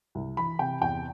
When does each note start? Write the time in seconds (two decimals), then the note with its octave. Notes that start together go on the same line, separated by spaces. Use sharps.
0.15 C2
0.37 E3 B5
0.59 C3 G5
0.81 E2 G5